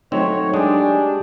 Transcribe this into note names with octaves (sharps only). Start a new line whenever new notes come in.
F#3 A3 C4 D#4 C#5
G#3 D4 G4 G#4